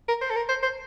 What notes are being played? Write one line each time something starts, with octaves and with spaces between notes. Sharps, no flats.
A#4
C5
A4
A#4
C5
C5